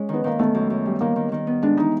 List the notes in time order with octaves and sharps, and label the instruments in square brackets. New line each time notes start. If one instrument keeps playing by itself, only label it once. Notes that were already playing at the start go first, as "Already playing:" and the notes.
Already playing: [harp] G#3 C#4
[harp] D#3 [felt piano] B3
[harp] D#3 [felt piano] A#3
[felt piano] A3 [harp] B3
[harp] F#2
F#2
G3
[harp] D#3 [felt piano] A#3
[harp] D#3
D#3
B3
[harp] G#3 [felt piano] D4
[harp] E3 [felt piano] D#4